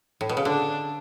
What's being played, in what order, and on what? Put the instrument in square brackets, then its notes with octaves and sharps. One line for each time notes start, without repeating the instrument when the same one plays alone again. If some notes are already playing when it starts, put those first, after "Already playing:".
[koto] A2
B2
C#3
[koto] D3 [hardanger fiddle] D4